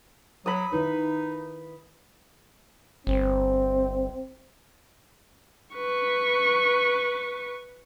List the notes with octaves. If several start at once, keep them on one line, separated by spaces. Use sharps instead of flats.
F#3 B5 D#6
D#3 D#4 E4 B4
G1 C4
B4 C#6